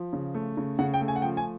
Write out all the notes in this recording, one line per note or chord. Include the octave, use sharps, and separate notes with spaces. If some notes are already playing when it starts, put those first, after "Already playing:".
Already playing: F3
C#3
A3
C#3
C#3 F#5
G5
A3
G#5
F#5
F3 G5
G#5